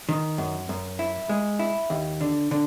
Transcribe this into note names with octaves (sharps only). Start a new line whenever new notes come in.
D#3
F#2
F#2
E4
G#3
E4
D#2
D3
D3